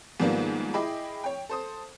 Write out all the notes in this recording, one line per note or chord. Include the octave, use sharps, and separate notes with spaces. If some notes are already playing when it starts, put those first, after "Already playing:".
G#2 D#3 F3 G3 A#3 B3
E4 G#4 D#5 G5 B5 D6
C#5 G5
A4 C5 D#6